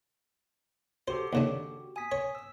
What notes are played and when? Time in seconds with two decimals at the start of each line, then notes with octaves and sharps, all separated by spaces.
1.08 F#4 G4 A4 C5
1.33 D#2 C#3 D4
1.96 G#5 D#6 B6
2.12 C#5
2.35 E6